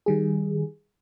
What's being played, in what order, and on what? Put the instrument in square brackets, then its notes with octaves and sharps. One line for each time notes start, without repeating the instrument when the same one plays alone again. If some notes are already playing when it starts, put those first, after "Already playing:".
[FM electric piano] D#3 G3 G#4